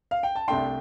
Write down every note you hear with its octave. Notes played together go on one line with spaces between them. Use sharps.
F5
G5
A5
C2 C3 A3 D4 G5 C6